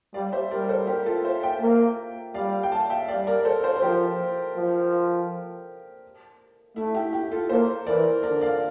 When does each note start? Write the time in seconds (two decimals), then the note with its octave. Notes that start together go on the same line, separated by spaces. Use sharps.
0.14 G3 D5 F5
0.32 C5 E5
0.51 G3 A#4 D5
0.62 A#4
0.69 A4 C5
0.87 G4 A#4
1.06 F4 A4
1.24 C5 E5
1.43 E5 G5
1.61 A#3
2.34 G3 D5 F5
2.63 G5
2.72 F5 A5
2.90 E5 G5
3.08 G3 D5 F5
3.27 A#4 D5
3.45 A4 C5
3.63 A4 C5
3.76 C5
3.82 F3 G4 A#4
4.56 F3
6.76 A3 E4
6.94 E4 G4
7.13 E4 G4
7.32 F4 A4
7.49 A#3 A4 C5
7.86 E3 A#4 D5
8.23 D3 A#4 D5
8.41 D5 F5